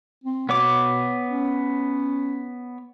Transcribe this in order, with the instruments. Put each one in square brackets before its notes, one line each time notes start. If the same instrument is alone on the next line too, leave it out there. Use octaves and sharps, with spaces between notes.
[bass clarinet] C4
[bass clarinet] B2 [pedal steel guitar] B3 C#5 D6
[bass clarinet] C#4